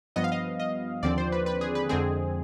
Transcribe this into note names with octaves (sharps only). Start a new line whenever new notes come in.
G2 F3 B3 D#5
F5
D#5
D#5
D#2 D3 F3 C4 D5
C5
B4
B4
G#4
B4
F2 D3 G#3 C4 G#4